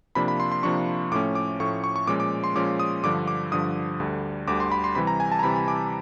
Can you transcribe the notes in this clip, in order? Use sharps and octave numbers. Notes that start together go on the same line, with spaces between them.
C3 F3 A#3 D4 B5
B5
C6
C6
C3 F3 A#3 D4 C#6
A2 F3 A3 C#4 D6
D6
A2 F3 A3 C#4 C#6
C#6
C#6
A#2 F3 G#3 C#4 D6
D6
C6
A#2 F3 G#3 C#4 D6
D#6
G2 D3 F3 D6
D6
G2 D3 F3 D#6
D2 D3 G3
D2 D3 G3 D6
C6
B5
C6
C3 E3 G3 B5
A#5
G#5
A5
A#5
C3 E3 G3 B5
B5
D6